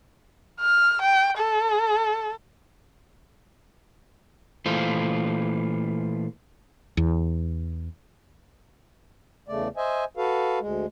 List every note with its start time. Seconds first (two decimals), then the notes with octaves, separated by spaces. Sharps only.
0.60 F6
1.02 G5
1.37 A4
4.66 A#2 E3 A3 F4 C5
6.97 E2
9.48 E2 C#3 A3 D5
9.77 C5 D#5 E5 G#5
10.17 F#4 A4 B4 F5
10.59 D2 G#3